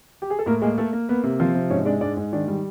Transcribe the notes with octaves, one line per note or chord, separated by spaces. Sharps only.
G4
G#4
A4
A2 A#3 A#4
G#3 A#3 G#4
A3 A#3 A4
A#3
A#3 B3 B4
C3
F3 C4 C5
C3
G#2 C#4 C#5
G#3 D4 D5
G#2 D4 D5
G#2
D#3 D4 D5
G3